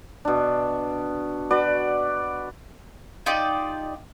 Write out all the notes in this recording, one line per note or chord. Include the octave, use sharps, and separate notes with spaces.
B2 D4
F#4 B4 D5
D#4 F4 G4 D5